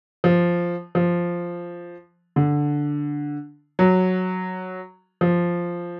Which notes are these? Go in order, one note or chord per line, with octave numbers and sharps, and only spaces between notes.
F3
F3
D3
F#3
F3